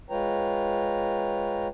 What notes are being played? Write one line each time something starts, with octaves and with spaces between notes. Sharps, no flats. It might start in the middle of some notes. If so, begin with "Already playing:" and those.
G#3 F4 B4 C#5 G5 A#5